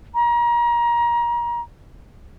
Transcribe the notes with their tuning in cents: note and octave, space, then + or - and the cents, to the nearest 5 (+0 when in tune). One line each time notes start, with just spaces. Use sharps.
A#5 +30